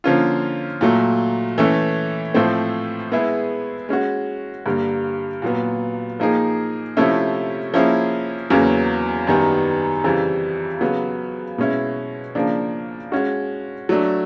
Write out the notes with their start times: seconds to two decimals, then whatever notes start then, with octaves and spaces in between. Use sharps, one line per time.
0.04 D3 F3 A#3 C#4 F4
0.81 A#2 F#3 A3
1.58 E3 A3 C#4
2.34 A2 F3 A3 C4
3.12 G#3 B3 E4 G#4
3.89 G#3 C#4 F#4
4.66 G2 D3 G3 A#3
5.42 A#2 F#3 B3
6.20 F3 A#3 D#4 G#4
6.97 C3 F3 A3 C#4 E4
7.74 F3 A#3 C#4 E4 G#4
8.50 E2 C#3 F#3 A#3 C#4
9.27 F#2 D#3 G3 B3
10.04 F2 C#3 E3 G3
10.81 C#3 F#3 B3
11.58 B2 G#3 C#4 E4
12.35 C#3 F3 A#3 D4
13.12 G#3 C#4 F#4
13.89 F#3 A3 D4